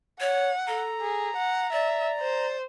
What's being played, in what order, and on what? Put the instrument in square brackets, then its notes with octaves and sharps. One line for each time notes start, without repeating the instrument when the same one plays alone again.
[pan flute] C#5 [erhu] F#5
[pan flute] A4 [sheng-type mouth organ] A#5
[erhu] G#4
F#5
[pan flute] D5 [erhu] E5
[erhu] C5